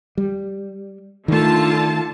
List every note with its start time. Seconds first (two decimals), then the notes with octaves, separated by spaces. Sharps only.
0.18 G3
1.28 D3 D#3 A3 F4 A5